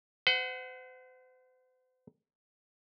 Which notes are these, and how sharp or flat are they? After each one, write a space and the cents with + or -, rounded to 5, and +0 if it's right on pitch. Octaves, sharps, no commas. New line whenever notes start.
C5 -40 F#5 +0